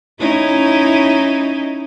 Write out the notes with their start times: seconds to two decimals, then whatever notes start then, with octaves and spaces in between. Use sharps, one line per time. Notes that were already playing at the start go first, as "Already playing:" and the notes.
0.20 C#4 D#4 E4